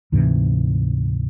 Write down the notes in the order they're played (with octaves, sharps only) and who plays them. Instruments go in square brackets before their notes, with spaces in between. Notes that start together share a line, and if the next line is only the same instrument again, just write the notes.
[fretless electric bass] D2 G#2 C3 E3